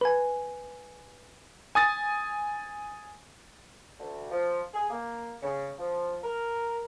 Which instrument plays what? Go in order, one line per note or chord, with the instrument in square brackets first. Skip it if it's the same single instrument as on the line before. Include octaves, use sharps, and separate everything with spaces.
[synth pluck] B4 G#5
[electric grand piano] G#5 D#6 A6
[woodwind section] D2
F3
G#4
A#3
C#3
F3
A#4